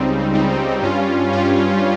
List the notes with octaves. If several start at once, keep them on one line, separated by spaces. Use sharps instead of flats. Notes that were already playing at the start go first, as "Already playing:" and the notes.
Already playing: C#2 C#3 G3 C4 D#4
C#2 C#3 G3 C4 D#4
G2 G3 C#4 F4
G2 G3 C#4 F4